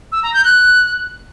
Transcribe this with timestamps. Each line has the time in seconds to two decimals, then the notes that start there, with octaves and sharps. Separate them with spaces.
0.12 E6
0.23 A#5
0.34 G6
0.45 F#6